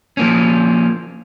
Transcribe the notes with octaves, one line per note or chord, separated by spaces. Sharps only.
F3 A#3 C#4